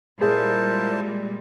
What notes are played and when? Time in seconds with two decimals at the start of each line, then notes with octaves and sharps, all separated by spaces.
0.21 A#2 G3 G#3 E4 G#4 A#4 C5 A5